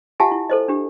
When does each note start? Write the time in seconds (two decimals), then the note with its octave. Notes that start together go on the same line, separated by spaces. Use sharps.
0.20 F4 G4 E5 F#5 G#5 A5
0.31 E4
0.50 A4 C5 D#5
0.68 D4 G4